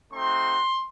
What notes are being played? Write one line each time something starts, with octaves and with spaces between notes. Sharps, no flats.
A3 C4 D#4 F#4 C6